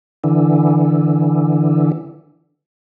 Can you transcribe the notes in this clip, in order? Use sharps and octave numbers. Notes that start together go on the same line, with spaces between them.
D3 E3